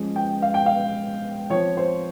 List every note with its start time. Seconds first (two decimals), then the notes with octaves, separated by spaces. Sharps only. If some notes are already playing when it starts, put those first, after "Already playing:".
Already playing: F3 G#3 C#4
0.16 G5
0.42 F5
0.54 G5
0.66 F5
1.50 F3 C#5
1.54 C4
1.77 C5